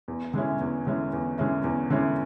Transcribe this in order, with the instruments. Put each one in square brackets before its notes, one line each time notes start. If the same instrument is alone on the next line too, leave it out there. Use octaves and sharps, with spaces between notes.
[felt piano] E2
D3 G#3 C#4 E4
E2
D3 G#3 C#4 E4
E2
D3 G#3 C#4 E4
E2
D3 G#3 C#4 E4